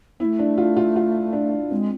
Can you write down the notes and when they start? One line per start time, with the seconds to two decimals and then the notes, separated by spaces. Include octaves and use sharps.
0.20 A3 B3 E4
0.39 D4
0.58 F4
0.77 F4
0.96 F4
1.33 D4
1.71 G#3 C4